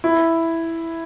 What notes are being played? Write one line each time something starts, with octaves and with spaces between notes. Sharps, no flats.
E4